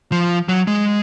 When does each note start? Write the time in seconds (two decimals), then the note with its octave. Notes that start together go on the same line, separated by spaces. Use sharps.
0.12 F3
0.49 F#3
0.67 G#3